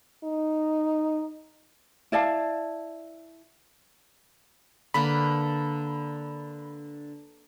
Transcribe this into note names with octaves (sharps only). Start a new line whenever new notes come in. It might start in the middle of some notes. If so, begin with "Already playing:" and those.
D#4
E4 D5 F5 A5
D3 A#3 B4 B5